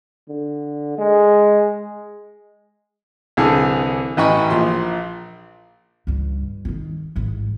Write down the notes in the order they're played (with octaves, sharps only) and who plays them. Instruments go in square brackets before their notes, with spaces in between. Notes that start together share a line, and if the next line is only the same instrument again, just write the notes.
[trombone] D3
G#3
[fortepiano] C2 D3 E3 G#4 A5
A1 E3 D#5 G5 B5 C#6
A#1 F3 C6
[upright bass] C#2 G2
D3 D#3
A1 G#2